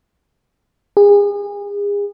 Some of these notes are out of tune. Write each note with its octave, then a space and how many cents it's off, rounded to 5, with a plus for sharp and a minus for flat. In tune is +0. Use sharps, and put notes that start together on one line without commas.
G#4 -35